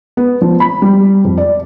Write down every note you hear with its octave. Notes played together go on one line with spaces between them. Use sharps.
B3
F3
B5
G3
F2
D5